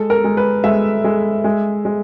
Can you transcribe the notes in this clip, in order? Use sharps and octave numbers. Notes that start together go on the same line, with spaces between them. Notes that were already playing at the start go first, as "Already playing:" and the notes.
Already playing: G#3 A4
A#4
G#3
B4
G#3 E5
G#3
G#3
G#3